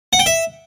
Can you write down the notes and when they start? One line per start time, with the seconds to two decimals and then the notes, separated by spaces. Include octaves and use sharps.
0.13 F#5
0.19 G5
0.26 E5